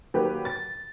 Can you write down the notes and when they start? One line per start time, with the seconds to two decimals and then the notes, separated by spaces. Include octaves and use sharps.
0.14 D#3 F#3 A#3 G4 B4
0.45 A6